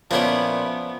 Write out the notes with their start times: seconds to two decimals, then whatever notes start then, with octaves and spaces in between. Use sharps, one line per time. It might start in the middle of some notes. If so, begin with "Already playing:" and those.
0.11 A#2 F3 B3 C#4 E4 A#4 D5